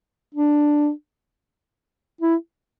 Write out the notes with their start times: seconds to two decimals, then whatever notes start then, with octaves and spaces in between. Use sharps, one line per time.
0.35 D4
2.21 E4